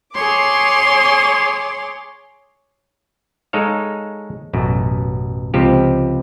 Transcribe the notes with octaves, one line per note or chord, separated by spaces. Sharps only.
G#4 C#5 C6 D6
G#3 D#4 A4 C#5 F5
A1 F#2 B2
C#2 C3 F3 G4